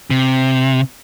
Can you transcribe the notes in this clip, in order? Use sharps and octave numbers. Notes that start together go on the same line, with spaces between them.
C3